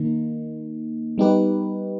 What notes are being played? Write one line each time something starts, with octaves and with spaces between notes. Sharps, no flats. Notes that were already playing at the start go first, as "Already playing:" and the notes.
Already playing: D#3 A#3 D#4
G3 B3 D#4 G4 B4